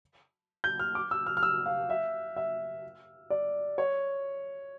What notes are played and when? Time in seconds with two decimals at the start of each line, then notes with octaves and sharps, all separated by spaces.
0.64 G6
0.79 F6
0.95 D6
1.11 E6
1.27 F6
1.37 F6
1.43 E6
1.66 F5
1.90 E5
2.36 E5
3.30 D5
3.78 C#5